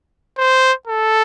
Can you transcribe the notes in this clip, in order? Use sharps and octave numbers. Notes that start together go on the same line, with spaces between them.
C5
A4